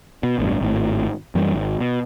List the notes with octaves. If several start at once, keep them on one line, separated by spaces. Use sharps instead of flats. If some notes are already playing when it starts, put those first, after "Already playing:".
B2
A1 E2 G2
G#1 A2
F#2 E3 F#3 G3
G#1
B2